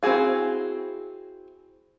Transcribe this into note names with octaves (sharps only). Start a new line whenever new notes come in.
C4 E4 F#4 G#4 F5